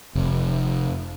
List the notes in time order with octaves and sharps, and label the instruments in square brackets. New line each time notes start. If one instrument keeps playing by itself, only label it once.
[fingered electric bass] F1